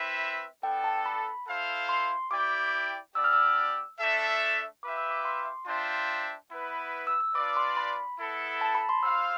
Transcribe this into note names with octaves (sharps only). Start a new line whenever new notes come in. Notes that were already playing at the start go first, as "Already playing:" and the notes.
Already playing: C4 E4 B4 E5
B3 D4 A4 G5
A5
B5
E4 A4 C5 F5
C6
E4 G4 D5 G5 D6
B3 D4 G4 D5 E6
F6
E6
A3 D4 A4 E5
F4 B4 E5 G5 D6
E6
D6
C6
D4 F4 C5 E5 G5
B3 E4 B4
E6
E6
D4 F4 B4 D5 D6
C6
B5
B3 E4 A4
A5
B5
C6
F4 C5 F5 E6